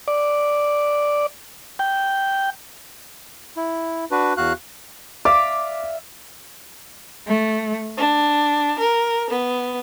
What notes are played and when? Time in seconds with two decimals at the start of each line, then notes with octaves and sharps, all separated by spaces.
0.08 D5
1.79 G5
3.57 E4
4.11 D4 F#4 B4
4.37 E2 F#4 F5 F#6
5.25 D5 E5 F5 D6
7.27 A3
7.98 D4
8.80 A#4
9.30 B3